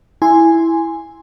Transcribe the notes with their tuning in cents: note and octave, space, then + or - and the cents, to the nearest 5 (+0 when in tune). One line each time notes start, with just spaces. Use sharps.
E4 +0 G#5 -5 C6 +0